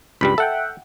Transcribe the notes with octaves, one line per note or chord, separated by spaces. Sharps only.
C#2 G2 G3 B5
A4 E5 F#5 G5